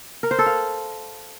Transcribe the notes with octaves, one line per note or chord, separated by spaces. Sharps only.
A#4
C5
A4
F5